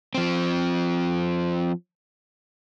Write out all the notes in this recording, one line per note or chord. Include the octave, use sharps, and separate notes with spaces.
F3 C4